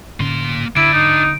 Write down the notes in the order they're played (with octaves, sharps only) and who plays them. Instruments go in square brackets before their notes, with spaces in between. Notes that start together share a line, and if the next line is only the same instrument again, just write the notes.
[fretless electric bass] A2 D3 C#4 [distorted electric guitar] A#3 C6
[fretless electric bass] D3 [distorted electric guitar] D4 B4 [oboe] E4 [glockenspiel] D7
[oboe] D#4